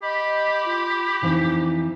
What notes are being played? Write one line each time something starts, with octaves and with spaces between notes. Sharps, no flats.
G4 D#5 B5
F4
F2 E3 C4 D#4